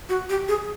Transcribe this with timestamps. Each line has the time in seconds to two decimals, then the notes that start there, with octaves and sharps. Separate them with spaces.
0.09 F#4
0.30 G4
0.48 G#4